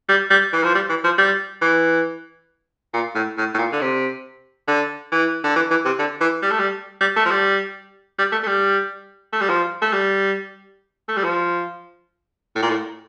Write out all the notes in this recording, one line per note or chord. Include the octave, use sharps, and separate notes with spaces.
G3
G3
E3
F3
G3
E3
F3
G3
E3
A#2
A2
A2
A2
A#2
D3
C3
D3
E3
D3
E3
E3
C3
D3
E3
G3
A3
G3
G3
A3
F3
G3
G3
A3
A3
G3
A3
G3
F3
A3
G3
A3
G3
F3
A2
A#2
A2